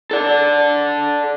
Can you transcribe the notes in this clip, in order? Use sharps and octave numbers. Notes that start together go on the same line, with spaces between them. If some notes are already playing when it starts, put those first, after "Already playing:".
A4 D5